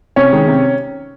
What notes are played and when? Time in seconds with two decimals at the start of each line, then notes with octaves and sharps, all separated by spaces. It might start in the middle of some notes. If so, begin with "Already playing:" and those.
0.16 C3 C#4 C#5
0.32 D#3 G#3
0.48 C3